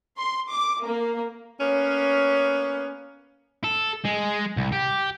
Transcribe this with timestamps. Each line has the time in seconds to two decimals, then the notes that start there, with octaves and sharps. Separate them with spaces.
0.18 C6
0.49 D6
0.83 A#3
1.59 A#3 B3 C#4
3.64 A4
4.05 G#3
4.57 C2
4.72 G4